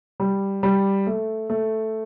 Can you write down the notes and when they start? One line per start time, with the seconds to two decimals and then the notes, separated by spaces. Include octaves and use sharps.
0.20 G3
0.63 G3
1.07 A3
1.50 A3